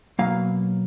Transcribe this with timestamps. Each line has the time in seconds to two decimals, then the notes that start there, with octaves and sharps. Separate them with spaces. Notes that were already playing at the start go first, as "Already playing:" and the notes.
0.19 B2 F#3 A#3 F5